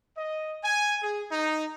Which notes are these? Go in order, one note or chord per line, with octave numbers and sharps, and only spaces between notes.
D#5
G#5
G#4
D#4